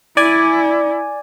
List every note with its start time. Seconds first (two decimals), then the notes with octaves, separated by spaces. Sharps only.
0.17 E4 D5 G#5